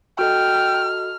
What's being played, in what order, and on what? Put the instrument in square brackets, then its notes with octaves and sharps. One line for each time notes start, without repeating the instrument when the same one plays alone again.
[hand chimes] F#4 A4 D#5 [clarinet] G5 [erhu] F6